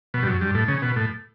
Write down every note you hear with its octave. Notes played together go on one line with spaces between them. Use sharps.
B2
G2
F#2
G2
A2
C#3
B2
A2